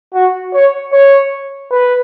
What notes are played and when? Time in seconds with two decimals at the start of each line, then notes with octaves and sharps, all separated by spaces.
0.14 F#4
0.53 C#5
0.93 C#5
1.71 B4